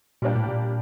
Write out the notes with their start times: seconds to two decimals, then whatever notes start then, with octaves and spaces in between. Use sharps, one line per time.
0.22 A#2 G3 A#3 D4 G4
0.35 A2
0.49 A#2